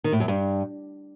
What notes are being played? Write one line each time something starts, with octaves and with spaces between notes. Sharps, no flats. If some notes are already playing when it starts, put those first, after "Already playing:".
D#3
A2
F#2
G2